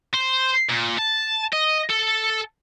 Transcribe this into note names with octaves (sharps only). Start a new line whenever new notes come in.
C5
A#2
A5
D#5
A4